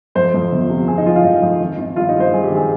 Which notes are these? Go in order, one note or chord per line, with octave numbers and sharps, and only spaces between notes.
F2 C5
F2
G1
C3
C3 G#4
D#4
F3 F4
F4
F2 D#4
F2
G#1
G#1
G2 F4
D#4
G2
C5
G2 G#4
G4
G#1
G#4